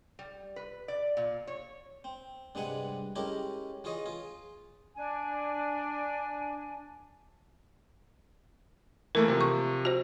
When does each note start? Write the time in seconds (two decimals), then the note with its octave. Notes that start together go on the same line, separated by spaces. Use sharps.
0.19 G3
0.56 B4
0.88 D5
1.17 A#2
1.47 C#5
2.04 C4
2.55 G2 C3 G#3 B4 F#5 G#5
3.16 G#3 C#4 E4 G4 A4 A#4
3.84 E3 F4 G#4 C#5 D#5
4.06 F4 G#4
4.94 D4 G#5
9.15 E3 A3 A#3 A#4
9.28 C3 F3
9.41 C#6
9.85 F#4 C5